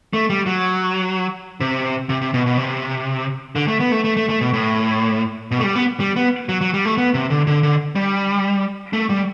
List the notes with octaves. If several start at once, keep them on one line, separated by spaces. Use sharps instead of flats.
A3
G3
F#3
C3
C3
C3
B2
B2
C3
D3
A3
B3
A3
A3
A3
A3
B2
A2
B2
A3
G3
B3
G3
B3
F#3
F#3
G3
A3
B3
C3
D3
D3
D3
G3
A3
G3